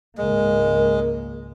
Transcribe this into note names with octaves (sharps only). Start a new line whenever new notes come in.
G#1 C#2 G#3 A#3 A#4